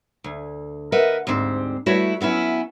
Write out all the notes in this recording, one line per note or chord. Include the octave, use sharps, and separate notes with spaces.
D2
A#4 B4 D#5 E5 F#5
D2 G#2 C4 G4
G3 A3 E4 F#4 B4 C#5
F#3 B3 C#4 E4